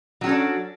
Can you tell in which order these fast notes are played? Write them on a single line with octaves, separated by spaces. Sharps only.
F#3 F#4 C#4 A4 D4